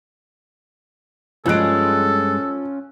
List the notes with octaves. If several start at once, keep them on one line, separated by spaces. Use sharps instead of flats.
G2 F3 G#3 C#4 F4 A4 F#6 D7